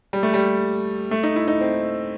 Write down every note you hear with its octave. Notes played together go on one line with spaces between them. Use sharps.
G3
A3
G3
A3
D#4
E4
D#4
C4